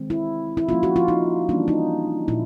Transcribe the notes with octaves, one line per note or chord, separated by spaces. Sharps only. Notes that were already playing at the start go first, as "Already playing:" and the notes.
Already playing: D#3 G#3 C4
E4
E4
F3 A#3 C#4 F4
F#4
F4
D#4
E3 G3 A#3 C#4 D4
D#4
A#2 F3 E4